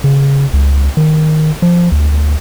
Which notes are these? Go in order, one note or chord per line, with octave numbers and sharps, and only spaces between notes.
C#3
C#2
D#3
F3
D2